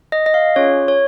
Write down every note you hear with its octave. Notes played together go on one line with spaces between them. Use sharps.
D#5
D#5
F5
C#4 F4 G#4 C#5
C#5